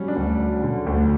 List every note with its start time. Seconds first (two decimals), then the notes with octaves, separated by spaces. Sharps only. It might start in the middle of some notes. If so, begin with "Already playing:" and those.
Already playing: F#3 G3 C#4
0.08 D4
0.16 D2
0.40 F#3
0.63 D3
0.86 D2